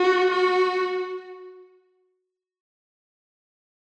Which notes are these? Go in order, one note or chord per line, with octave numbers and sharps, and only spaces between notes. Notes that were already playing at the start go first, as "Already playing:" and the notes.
Already playing: F#4
F#4